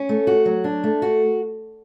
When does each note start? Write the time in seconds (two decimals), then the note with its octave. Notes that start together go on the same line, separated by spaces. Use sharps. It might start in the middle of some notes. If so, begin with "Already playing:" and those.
Already playing: C#4
0.09 A3
0.27 F#4
0.45 F#3
0.64 D4
0.84 A3
1.02 F#4